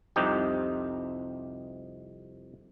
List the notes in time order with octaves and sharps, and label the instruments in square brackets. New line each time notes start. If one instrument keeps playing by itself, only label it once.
[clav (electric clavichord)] C2 F2 C3 D#4 G4